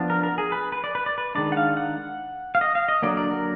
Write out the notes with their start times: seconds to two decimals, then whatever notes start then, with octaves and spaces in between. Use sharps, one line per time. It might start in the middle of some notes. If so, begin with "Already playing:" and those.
Already playing: F3 B3 D4
0.10 A#4
0.23 A#4
0.38 G#4
0.52 B4
0.72 B4
0.84 D5
0.95 B4
1.06 D5
1.18 B4
1.35 D#3 G#3 D4 D5
1.52 F#5
1.57 F5
1.77 F#5
2.55 F5
2.61 D#5
2.75 F5
2.89 D#5
3.02 D3 F#3 A#3 D5
3.17 D5
3.31 A#4